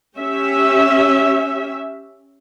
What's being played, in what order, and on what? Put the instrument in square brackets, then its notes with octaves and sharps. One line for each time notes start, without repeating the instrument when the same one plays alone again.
[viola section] C#4 G4 E5